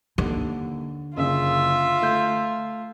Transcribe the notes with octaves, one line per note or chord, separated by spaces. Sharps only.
D#2 D3
F#1 C#3 F4 E5
A3 G6